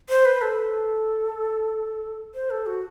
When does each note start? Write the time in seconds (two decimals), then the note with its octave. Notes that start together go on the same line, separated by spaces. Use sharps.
0.10 C5
0.25 B4
0.42 A4
2.35 C5
2.50 A4
2.66 F#4